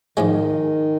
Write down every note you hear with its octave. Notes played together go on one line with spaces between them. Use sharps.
G#2 D#3 F3 G#3